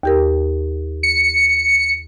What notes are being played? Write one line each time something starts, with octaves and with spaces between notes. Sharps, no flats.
D#2 G4 A#4
C#7